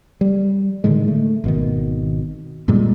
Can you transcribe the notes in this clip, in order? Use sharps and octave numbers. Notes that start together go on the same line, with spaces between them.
G3
A2 D3 D#3 G#3
A3
G#1 B2 D#3
F#2 A#2 G3 G#3